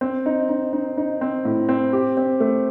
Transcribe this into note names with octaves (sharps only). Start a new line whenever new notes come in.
C4
D#4
D#4
D#4
D#4
C4
A2
C4
G4
C4
A3